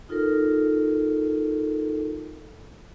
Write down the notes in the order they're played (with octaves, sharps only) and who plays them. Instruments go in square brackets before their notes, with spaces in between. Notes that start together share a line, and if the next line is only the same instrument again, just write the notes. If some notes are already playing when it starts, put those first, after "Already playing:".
[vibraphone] D#4 F4 A4 A#4